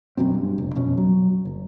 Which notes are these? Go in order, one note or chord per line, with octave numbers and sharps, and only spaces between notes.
G1 F#2 B2 C4
G2
F1
F2 B2 C#4
F#3
F#1